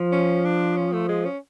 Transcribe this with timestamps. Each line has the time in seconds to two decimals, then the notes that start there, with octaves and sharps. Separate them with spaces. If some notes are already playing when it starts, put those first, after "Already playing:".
Already playing: F3
0.12 C#4
0.45 D4
0.77 C#4
0.93 A3
1.09 G#3
1.25 C#4